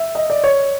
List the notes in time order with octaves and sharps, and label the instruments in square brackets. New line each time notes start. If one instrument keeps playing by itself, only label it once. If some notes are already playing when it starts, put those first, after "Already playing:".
Already playing: [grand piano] E5
D#5
D5
C#5